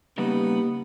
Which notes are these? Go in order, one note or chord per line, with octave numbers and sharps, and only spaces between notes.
C#3 G3 A#3 B3 D#4 G4